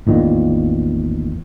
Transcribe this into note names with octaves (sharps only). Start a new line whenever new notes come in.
A1 E2 A#2 D#3